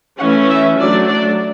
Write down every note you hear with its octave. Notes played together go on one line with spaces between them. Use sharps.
E3 A3 C#4 F#5
E5
F#3 A3 D4 D5
D5